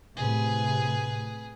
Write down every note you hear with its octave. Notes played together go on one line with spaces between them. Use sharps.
A2 C3 G#4 B4